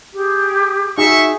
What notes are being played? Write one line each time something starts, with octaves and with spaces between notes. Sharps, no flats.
G4 G#4
D#4 F#4 G#4 E5 C#6